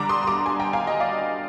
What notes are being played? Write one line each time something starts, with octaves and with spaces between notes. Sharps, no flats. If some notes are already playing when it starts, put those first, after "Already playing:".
Already playing: D3 G3 D4 A#5 D6
C6 D#6
C6
A#5 D6
G#5 C6
G5 A#5
F5 G#5
D#5 G5
D5 F5